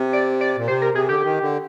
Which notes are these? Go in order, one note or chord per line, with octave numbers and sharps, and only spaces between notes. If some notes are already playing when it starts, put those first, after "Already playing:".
Already playing: C3
D5
D5
A#2
C3 C5
A#4
C3 G#4
D3 G4
D#3
D3